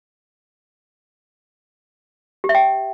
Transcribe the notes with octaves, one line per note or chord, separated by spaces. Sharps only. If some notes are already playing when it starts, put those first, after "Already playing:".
G4
E5
G5